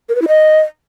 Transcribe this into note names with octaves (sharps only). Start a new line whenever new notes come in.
A#4
B4
E4
D#5